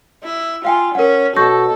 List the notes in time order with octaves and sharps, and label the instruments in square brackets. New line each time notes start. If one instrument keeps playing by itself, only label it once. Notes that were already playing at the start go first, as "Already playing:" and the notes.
[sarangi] E4
[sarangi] F4 [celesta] F5 G5 G#5
[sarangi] C#4 [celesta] A#4 F#5
[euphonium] B2 [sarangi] A4 [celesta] C#6 G6 A#6